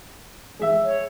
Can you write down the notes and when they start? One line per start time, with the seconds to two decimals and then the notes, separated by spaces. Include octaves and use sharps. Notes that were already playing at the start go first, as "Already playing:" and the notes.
0.59 G#3 E5
0.84 C#5